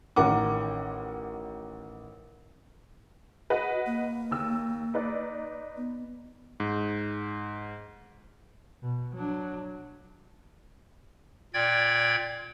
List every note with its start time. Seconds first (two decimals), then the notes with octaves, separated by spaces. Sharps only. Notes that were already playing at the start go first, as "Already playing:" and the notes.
0.16 A1 D#3 A#4 F#5 D6
3.50 F#4 B4 D#5 F#5
3.86 A#3
4.31 D#2 E6
4.94 D#4 B4 D5
5.77 B3
6.60 G#2
8.82 B2
9.13 F#3 D4
11.54 A#2 D5 G5 G#6